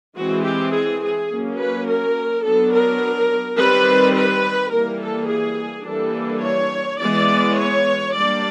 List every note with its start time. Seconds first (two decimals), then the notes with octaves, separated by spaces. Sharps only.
0.17 E3 G#3 C4 F#4
0.45 G4
0.73 G#4
1.02 G#4
1.31 F#3 A#3 C#4
1.60 B4
1.87 A#4
2.45 F#3 B3 D4 A4
2.74 A#4
3.58 D#3 G3 C4 B4
4.15 B4
4.72 E3 G3 A#3 A#4
5.01 A4
5.29 G#4
5.86 E3 G3 A#3 D4 A4
6.43 C#5
7.00 E3 G#3 B3 D5
7.58 C#5
8.14 G3 A#3 D4 D5